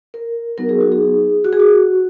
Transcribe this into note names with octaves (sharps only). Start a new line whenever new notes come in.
A#4
F#3 B3 D#4 F#4 A#4
G#4
F#4
G#4
F#4
G#4
F#4